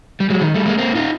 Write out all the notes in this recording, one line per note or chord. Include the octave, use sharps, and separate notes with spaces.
G3
F#3 G#3
D#3
G3 A3
G#3 A#3
A#3 C4
D#4 F4